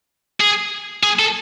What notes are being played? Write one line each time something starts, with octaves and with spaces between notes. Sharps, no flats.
G#4
G#4
A4